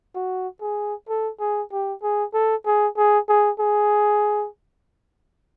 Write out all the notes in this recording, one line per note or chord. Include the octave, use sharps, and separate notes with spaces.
F#4
G#4
A4
G#4
G4
G#4
A4
G#4
G#4
G#4
G#4